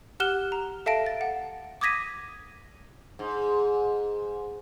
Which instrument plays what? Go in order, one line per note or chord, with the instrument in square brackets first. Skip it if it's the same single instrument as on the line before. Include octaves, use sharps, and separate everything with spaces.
[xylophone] G4 F#5 F6 F#6 E7 G7
A#5
A4 E5 F5 A5 A#6 D7
A6
F#5
D6 D#6 G#6 A#6 B6 D#7
[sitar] G#2